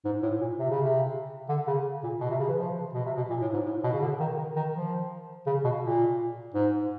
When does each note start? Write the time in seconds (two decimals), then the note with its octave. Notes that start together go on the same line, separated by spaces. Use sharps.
0.05 G#2
0.23 A2
0.41 A#2
0.58 C3
0.70 C#3
0.82 C3
1.49 D3
1.67 C#3
2.03 A#2
2.21 B2
2.30 C3
2.39 C#3
2.48 E3
2.57 F3
2.93 B2
3.06 C3
3.17 B2
3.30 A#2
3.41 A2
3.53 G#2
3.65 A2
3.84 B2
3.93 C#3
4.01 D3
4.20 D#3
4.38 D#3
4.56 D#3
4.74 F3
5.46 C#3
5.64 B2
5.83 A#2
6.54 G#2